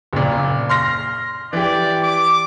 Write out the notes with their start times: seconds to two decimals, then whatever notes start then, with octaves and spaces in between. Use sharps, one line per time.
0.13 F#1 A#2
0.69 C6 F6 A#6
1.53 E3 G4 D5
2.03 D6